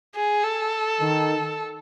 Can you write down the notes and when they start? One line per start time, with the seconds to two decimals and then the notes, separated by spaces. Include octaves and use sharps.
0.15 G#4
0.44 A4
1.01 D#3